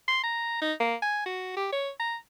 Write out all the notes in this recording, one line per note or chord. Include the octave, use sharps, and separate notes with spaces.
C6
A#5
D#4
A#3
G#5
F#4
G4
C#5
A#5